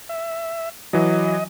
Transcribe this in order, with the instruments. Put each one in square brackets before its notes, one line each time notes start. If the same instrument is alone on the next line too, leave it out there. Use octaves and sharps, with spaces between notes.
[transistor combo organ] E5
[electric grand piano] E3 F#3 [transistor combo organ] D#5